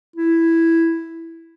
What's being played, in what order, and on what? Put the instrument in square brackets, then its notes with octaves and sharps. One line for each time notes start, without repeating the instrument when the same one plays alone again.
[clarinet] E4